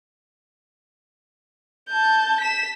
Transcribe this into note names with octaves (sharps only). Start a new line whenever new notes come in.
A5 G6
B6 E7